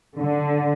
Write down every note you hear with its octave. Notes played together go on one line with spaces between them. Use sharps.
D3